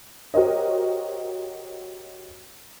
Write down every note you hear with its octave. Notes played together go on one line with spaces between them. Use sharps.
F#4 G4 A#4 C5 C#5 D#5